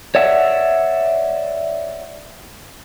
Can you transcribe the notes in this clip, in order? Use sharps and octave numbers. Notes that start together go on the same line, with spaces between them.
C#5 D5 E5 F#5